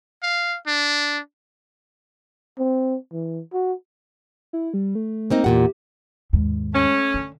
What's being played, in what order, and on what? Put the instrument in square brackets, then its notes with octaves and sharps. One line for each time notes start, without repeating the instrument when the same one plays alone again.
[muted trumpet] F5
D4
[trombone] C4
E3
F#4
[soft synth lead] E4
G3
A3
[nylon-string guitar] A#3 C4 D#4
[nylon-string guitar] E2 A#2 F#5 [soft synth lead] G4
[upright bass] D#2 G#2
[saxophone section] A3 C#4
[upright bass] D3